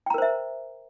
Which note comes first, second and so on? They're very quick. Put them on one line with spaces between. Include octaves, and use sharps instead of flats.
G5 A#5 A#4 C5 E5